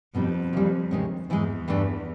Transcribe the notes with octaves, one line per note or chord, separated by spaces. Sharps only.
F2 B2 G3 B3 D#4
D#2 C#3 E3 G3
D2 C3 D#3 G#3 C#4
E2 G#2 E3 G#3
G2 E3 A3 D4